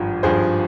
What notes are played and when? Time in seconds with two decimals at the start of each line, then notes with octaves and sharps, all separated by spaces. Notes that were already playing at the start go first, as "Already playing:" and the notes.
Already playing: G#1 G2 F3
0.23 G#1 G2 F3 G#4 C5